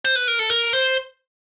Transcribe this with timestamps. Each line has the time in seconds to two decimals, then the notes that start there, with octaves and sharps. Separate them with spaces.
0.05 C5
0.16 B4
0.28 A#4
0.39 A4
0.50 A#4
0.73 C5